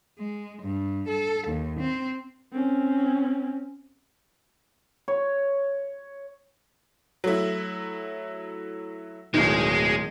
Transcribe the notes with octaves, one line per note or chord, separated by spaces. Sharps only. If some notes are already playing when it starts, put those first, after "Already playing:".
G#3
G2
A4
D#2
C4
C4 C#4
C#5
F#3 A3 E4
D1 B2 D#3 G#3